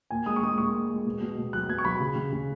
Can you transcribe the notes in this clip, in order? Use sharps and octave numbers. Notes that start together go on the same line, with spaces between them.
A#2 G#5
G#3 D#6
C#6
G#3 D#6
A#2 C#6
G#3
G#3
B2
B2
B2
F#3 F#6
B2 G#6
C#6
F#3 B5
C#3
C#3
C#3